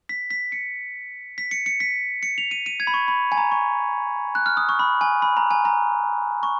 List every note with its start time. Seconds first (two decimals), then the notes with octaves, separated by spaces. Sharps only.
0.09 B6
0.30 B6
0.52 C#7
1.38 B6
1.51 C#7
1.66 C#7
1.80 B6
2.23 C#7
2.38 F7
2.51 D#7
2.66 D#7
2.80 G#6
2.87 B5
2.94 C#6
3.08 B5
3.32 G#5
3.37 A#5
3.51 C#6
4.35 F#6
4.46 F6
4.57 D#6
4.69 C#6
4.79 B5
5.01 G#5
5.22 B5
5.37 A#5
5.51 G#5
5.65 A#5
6.43 C#6